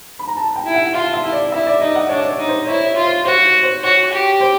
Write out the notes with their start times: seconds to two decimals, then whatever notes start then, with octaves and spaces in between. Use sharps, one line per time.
0.19 B5
0.28 A#5
0.37 A5
0.56 G5
0.66 E4
0.75 F#5
0.94 F4 F5
1.14 E5
1.23 E4
1.32 D5
1.52 E4 E5
1.67 D5
1.80 D#4 D#5
1.95 F#5
2.09 D4 C#5
2.29 C#5
2.39 D#4
2.48 C5
2.67 E4 C#5
2.87 C#5
2.96 F4
3.05 C5
3.25 F#4 C5
3.45 C5
3.63 C5
3.83 F#4 C#5
4.12 G4
4.41 C5